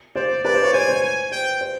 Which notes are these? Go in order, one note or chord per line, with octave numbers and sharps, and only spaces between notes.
C5 D5
B4 D5
C5
C#5
C5 G#5
C5
G#5
C5 G5
C5